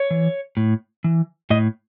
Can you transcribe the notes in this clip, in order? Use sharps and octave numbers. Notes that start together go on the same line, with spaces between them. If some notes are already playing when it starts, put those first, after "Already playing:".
Already playing: C#5
E3
A2
E3
A2 D#5